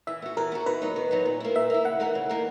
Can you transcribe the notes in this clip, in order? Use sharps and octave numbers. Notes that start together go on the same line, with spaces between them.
E3 E5
B3 F#4
E3 A#4
B3 F#4
D#3 B4
F#3 B3 D#4
D#3
F#3 B3 D#4
A#2
A#3 E4
A#2 E5
A#3 E4
C#3 F#5
E3 A#3 D#4 A#4
C#3
E3 A#3 D#4 A#4